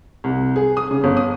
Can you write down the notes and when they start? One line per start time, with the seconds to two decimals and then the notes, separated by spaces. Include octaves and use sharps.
0.24 C2
0.56 G#4
0.77 D#6
0.91 C#3
1.04 G1
1.17 D#6